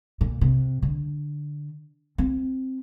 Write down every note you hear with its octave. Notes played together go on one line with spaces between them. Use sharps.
A#2
C3
D3
C4